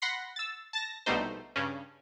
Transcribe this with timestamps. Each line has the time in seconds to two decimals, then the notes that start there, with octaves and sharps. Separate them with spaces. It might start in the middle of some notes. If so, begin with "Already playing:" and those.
0.02 F#5 B5 C6 A#6 C7
0.36 E6 A6
0.73 A5 A6 A#6
1.06 A#1 B2 G3 A3 D#4 C5
1.56 G2 C#3 C#4